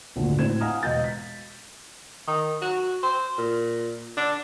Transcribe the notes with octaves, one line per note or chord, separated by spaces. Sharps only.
G#1 D2 A#2 D3
A2 C4 C5 G#6 E7
F5 F#5 G#5 A#5 D#6 F6
E1 D#5 F5 G6 A6
B6
D#3
F#4
C5
A#2
D4